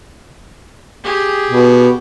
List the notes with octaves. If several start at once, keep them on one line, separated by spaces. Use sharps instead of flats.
G4 G#4
B2